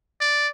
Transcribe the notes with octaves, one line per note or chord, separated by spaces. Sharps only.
D5